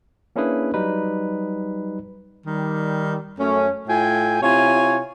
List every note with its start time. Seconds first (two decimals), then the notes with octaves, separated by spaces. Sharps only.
0.36 A#3 C#4 D4 E4 G#4 B4
0.74 F#3 G3 D#4 B4
2.46 D#3 G3
3.38 F#2 A3 C#4
3.88 A2 F4 G5 G#5
4.41 C3 E4 F4 C#5 G#5